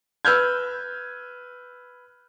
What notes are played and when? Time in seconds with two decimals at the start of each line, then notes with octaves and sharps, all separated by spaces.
0.25 B4 E6 F6 G6 G#6